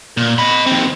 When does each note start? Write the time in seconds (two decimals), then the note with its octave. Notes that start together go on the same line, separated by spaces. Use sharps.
0.17 A#2
0.38 D#5 B5
0.66 D#2 C4